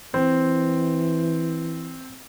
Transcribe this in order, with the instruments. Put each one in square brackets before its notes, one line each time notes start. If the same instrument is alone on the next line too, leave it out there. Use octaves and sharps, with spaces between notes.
[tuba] E3 [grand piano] C4